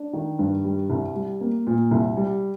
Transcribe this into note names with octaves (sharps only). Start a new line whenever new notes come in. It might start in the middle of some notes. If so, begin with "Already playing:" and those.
Already playing: D4
D#3
G2
G3
C2
G3
A#3
A#2
C2
G3